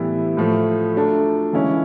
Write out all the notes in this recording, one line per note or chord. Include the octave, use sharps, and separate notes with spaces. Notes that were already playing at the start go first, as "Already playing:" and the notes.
Already playing: A2 E3 G3 B3 E4
A2 F3 A3
F#3 A3 D4 F4 A4
C#3 E3 G#3 C#4 E4